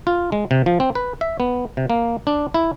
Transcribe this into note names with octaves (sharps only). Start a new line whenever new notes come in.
F4
G#3
C3
F3
C4
B4
E5
B3
C3
A#3
D4
E4